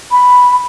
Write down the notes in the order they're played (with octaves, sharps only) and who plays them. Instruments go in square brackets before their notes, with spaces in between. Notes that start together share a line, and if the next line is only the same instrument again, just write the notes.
[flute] B5